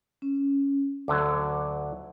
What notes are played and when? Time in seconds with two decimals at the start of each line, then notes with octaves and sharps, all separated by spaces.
0.22 C#4
1.08 D2 D3 F#3 D6